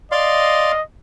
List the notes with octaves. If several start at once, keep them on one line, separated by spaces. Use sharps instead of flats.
D5 D#5 F5 C6